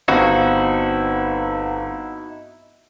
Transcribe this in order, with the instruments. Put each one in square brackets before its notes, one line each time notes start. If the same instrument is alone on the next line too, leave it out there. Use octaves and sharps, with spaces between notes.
[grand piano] G1 C4 F5 [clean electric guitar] D#4 E4 F#4